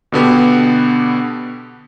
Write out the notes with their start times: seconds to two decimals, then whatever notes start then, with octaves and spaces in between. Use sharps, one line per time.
0.12 B2 D3 B3 G4